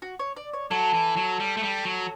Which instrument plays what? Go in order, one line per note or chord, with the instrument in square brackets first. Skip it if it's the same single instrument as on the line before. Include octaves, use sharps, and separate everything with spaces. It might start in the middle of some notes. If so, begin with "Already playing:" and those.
[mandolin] F#4
C#5
D5
C#5
[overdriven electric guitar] F#3 [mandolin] A4
[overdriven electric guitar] E3
F#3
G3
A3
G3
F#3